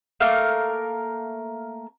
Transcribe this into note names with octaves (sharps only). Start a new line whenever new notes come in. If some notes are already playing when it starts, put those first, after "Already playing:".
A3 A#3 A#4 F5